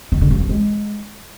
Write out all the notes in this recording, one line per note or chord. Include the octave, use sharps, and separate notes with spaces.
D#3
D3
F3
E3
G#3